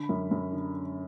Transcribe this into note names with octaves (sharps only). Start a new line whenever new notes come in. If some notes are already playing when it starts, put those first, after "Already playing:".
Already playing: D3 B5
F#2
F#2
D3